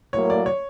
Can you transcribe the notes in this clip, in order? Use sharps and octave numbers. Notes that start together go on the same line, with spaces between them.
A2 F#3 A#3 C#5
D5
C#5